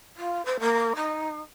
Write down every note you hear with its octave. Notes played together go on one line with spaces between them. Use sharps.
F4
C5
A#3
D#4